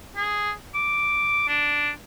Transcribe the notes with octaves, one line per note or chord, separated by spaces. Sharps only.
G#4
D6
D4